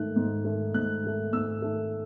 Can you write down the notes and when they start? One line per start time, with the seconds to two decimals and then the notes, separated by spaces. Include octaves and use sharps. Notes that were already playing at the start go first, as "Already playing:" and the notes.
Already playing: G#2 D#3 A3 F#6
0.16 G#2
0.45 D#3 A3
0.74 G#2 F#6
1.03 D#3 A3
1.33 G#2 E6
1.62 D#3 A3